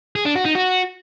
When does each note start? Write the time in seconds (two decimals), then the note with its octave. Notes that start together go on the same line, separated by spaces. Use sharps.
0.16 G#4
0.26 D4
0.35 F#4
0.45 D#4
0.55 F#4